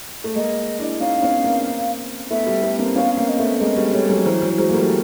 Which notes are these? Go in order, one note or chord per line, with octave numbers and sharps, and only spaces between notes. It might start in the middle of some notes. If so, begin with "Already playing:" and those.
A3
G#3 A#3 D#5
D4 E4
C#4 D#4 F5
B3 C#4
A#3 C4
A3 B3 E5
G3 A3
A3 B3
A#3 C4
B3 C#4 F5
A#3 C4 F5
D#5
A3 B3 E5
G#3 A#3 D#5
G3 A3
G3 A3 C#5
F#3 G#3
E3 F#3 C5
E3 F#3
F#3 G#3 C5
A#3
G3 A3